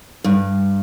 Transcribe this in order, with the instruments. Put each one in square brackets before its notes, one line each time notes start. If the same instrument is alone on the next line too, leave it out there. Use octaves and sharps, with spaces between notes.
[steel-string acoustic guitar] G2